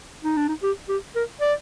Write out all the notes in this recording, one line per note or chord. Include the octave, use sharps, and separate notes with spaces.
D#4
D4
D#4
G4
G4
A#4
D5